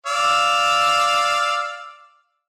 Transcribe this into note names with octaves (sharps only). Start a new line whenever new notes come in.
D5 F5 E6